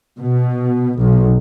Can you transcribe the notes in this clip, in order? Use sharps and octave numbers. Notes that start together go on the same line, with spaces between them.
B2
B1